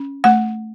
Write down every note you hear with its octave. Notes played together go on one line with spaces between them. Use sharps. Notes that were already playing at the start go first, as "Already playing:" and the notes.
Already playing: C#4
A3 F#5